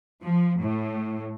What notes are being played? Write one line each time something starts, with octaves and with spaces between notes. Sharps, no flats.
F3
A2